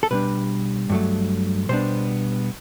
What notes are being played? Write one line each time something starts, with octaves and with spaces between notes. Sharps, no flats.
A4
B2 G3 D4 B4
G2 F#3 A3
B2 G3 B3 D4 C5